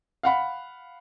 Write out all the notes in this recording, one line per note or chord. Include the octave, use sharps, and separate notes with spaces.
F5 F#5 B5